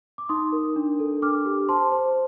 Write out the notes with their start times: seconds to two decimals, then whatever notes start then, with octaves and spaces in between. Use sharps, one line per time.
0.18 D6
0.29 D#4 C6 D#6
0.52 A#4
0.76 D4
1.00 A4
1.22 D4 D6 F6
1.46 G4
1.69 C5 A5 C6
1.92 C5